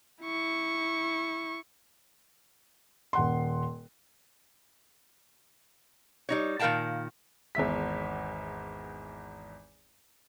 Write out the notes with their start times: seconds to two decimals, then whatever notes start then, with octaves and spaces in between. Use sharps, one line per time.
0.22 E4 C#6
3.13 D#1 F#5 C6
6.29 G3 D#4 C#5
6.59 A#2 D#3 A#4 F5 G5 A5
7.55 G#1 E2 E5 B6